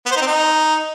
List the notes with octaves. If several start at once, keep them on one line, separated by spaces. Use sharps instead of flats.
B3
C5
D#4
C4
D#4